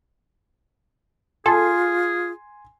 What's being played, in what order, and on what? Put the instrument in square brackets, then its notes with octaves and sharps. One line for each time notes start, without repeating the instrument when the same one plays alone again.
[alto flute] F4 [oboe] G#4 [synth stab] A4 [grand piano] G#5 C6